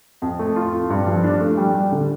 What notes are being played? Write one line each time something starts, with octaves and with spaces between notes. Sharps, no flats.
F2
A3
F4
F4
G2
F3
D4
A3
G3
G3
D3